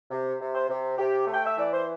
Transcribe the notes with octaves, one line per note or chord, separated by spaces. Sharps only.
C3
C3
C5
C3
C3 G4
A3
G5
E5
E3 D5
C5